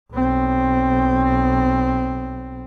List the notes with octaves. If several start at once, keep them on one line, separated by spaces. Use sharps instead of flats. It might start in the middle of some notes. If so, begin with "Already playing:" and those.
B1 C4